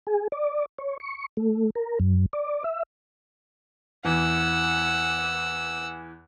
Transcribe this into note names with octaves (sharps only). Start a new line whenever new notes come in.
G#4
D5
C#5
C#6
A3
A#4
F#2
D5
E5
E2 E3 F#5 E6